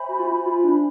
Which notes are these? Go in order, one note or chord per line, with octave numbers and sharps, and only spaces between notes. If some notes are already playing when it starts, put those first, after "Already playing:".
Already playing: C5 E5 G#5 B5
F#4
F4
F#4
F4
D4